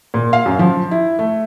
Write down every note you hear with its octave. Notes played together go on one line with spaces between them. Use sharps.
A#2
F5
F#2
F3
E4
A3